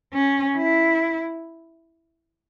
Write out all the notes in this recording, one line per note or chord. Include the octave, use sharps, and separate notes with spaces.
C#4
E4